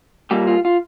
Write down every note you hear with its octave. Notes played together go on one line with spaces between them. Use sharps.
A#2 G3 A#3 G4
F4
F4